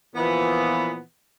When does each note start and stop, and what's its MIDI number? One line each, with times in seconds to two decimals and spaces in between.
0.15 0.99 46
0.15 0.99 52
0.15 0.99 53
0.15 0.99 59